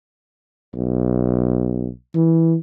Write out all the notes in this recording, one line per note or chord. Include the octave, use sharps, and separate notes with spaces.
B1
E3